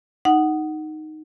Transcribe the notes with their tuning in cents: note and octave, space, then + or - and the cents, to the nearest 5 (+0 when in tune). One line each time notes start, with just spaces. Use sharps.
D#4 +0 F#5 +10